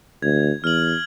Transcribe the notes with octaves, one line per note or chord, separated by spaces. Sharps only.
D2 G#6
E2 F6 F#7